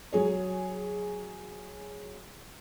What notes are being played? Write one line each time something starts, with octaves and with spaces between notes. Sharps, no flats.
F#3 G#4 C#5